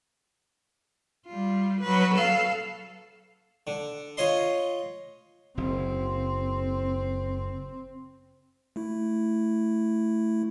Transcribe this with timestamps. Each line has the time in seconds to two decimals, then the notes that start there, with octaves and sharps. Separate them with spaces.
1.27 G3 F4
1.81 F#3 B4
2.15 A4 F5
3.67 D3
4.17 F4 C#5 D#5 C6
5.57 F#1 C4
8.76 A3 E4